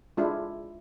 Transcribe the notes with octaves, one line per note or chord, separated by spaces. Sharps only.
G#3 D4 E4 F4